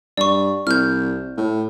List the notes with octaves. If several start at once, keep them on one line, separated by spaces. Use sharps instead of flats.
G2 D5 C#6
C2 F6 G6
A2